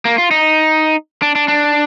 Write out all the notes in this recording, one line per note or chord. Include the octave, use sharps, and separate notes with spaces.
A#3
F4
D#4
D4
D4
D4